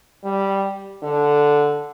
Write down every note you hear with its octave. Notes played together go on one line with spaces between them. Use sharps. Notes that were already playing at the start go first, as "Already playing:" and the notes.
G3
D3